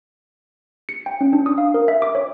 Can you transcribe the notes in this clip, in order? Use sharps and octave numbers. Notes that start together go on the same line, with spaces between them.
C#7
G5
C#4
D4
D#6
F5
A#4
E5
D6
C#5